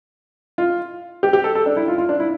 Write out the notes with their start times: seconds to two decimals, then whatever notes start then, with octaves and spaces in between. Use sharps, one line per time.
0.58 F4
1.23 G4
1.33 G4
1.44 A4
1.55 A4
1.66 D4
1.76 E4
1.88 F4
1.98 F4
2.09 D4
2.20 E4